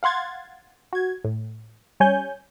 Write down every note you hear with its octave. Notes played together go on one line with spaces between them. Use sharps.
F5 F#5 C6 G#6 A6
F#4 G#6
A2
G3 C#4 C#5 G#5 G6